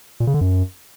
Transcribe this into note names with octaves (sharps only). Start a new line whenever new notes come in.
A#2
C#3
D3
F#2